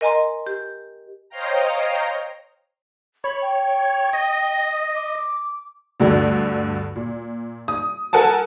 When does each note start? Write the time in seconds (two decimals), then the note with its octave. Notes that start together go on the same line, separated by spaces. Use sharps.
0.01 A#4 D#5 G#5 A#5 C6
0.47 G4
1.29 C5 C#5 D#5 F5 G5 A#5
3.24 C#5 B5
3.42 G5
4.13 D#5
4.95 D6
6.00 D2 G2 D3
6.96 A#2
7.68 D#6
8.13 A4 A#4 F#5 G#5 A5